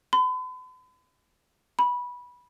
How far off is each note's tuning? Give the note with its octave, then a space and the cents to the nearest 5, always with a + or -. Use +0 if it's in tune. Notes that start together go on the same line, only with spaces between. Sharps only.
B5 +45
B5 -15